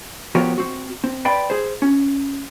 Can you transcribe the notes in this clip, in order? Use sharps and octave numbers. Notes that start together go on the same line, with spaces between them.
F3 B3 F#4 G4 A#4 C#5
C4 F#4
C4
B4 D5 G5 B5 C6
G#4 C5
C#4